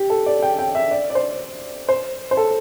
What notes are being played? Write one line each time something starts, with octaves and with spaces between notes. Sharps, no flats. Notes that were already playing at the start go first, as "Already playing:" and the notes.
Already playing: G4
A4
D5
G5
G5
E5
D5
D5
C5
C5
C5
A4